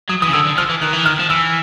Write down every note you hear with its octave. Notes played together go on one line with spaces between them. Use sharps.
F#3 D#6
E3 D#6
C#3
D3 E6
D3
F3 F6
E3
D#3 F#6
E3
D#3 F6
F3
E3 E6